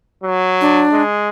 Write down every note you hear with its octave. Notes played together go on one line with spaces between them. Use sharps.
F#3
D4
G#3